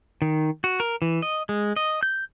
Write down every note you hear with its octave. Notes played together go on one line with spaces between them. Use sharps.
D#3
F#4
A#4
E3
D#5
G#3
D#5
G6